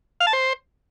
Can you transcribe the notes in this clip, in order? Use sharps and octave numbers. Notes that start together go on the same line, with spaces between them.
F5
A5
C5